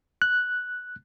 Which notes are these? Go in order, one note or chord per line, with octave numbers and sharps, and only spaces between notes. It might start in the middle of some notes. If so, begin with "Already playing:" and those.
F#6